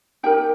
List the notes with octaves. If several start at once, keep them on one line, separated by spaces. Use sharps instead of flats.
D#4 G4 A#4 G5